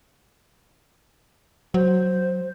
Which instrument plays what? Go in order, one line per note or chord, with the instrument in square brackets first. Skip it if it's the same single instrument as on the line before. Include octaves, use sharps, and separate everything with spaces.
[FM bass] F#3 [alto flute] C5